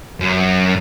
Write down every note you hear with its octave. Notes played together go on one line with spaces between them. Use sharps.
F#2